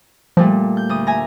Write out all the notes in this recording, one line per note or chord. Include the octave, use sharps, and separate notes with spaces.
A#2 F3 G3 A3
G6
D2 D#6
E5 G#5 A#5